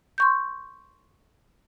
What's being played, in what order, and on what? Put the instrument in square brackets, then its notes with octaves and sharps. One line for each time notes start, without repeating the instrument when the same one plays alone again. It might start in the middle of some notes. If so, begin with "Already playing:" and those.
[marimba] C6 C#6 G6